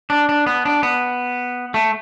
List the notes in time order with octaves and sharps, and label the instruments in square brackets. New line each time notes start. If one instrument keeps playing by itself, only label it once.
[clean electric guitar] D4
D4
B3
D4
B3
A3